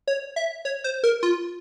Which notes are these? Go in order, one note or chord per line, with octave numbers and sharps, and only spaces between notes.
C#5
E5
C#5
C5
A#4
F4